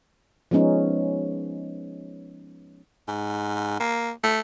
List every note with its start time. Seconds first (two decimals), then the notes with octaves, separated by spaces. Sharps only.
0.51 F3 G#3 B3 C#4 D#4
3.08 G#2
3.80 A#3
4.23 A3